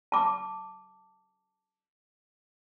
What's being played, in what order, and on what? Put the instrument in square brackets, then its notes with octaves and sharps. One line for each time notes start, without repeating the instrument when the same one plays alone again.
[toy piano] A5 D6